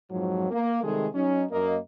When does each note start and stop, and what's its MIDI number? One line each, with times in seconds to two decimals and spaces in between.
0.10 0.49 41
0.10 0.49 44
0.10 0.49 53
0.10 0.49 54
0.51 0.80 58
0.83 1.07 48
0.83 1.07 51
0.83 1.07 55
0.83 1.07 56
0.83 1.07 68
0.83 1.07 69
1.14 1.45 54
1.14 1.45 61
1.14 1.45 63
1.51 1.77 42
1.51 1.77 58
1.51 1.77 75